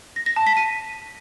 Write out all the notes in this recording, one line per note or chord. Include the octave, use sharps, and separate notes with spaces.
A#6
A#6
A5
B6
D#7